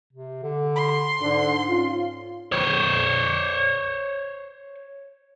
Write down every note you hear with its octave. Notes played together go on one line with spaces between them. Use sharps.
C3
D3
C6
G#2 D3
C#4 F4
C5 C#5